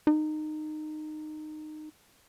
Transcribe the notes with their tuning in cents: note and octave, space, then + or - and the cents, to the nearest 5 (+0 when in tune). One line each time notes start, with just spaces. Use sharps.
D#4 -20